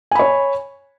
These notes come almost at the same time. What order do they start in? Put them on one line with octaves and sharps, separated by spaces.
G#5 B5 C#5